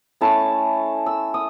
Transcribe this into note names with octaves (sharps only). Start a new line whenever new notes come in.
A3 C#4 E4 A5
E6
D#6